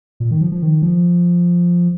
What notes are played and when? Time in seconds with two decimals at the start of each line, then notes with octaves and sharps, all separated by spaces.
0.20 A#2
0.31 D#3
0.41 F3
0.52 F3
0.62 D#3
0.82 F3